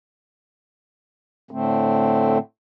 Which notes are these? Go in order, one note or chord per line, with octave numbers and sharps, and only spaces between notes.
A2 D3 A3 C4